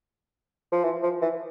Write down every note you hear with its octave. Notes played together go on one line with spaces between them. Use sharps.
F3
E3
F3
E3